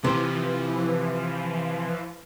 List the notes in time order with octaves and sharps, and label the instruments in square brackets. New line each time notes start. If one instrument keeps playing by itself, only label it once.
[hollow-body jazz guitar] C3 [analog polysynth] E3 F3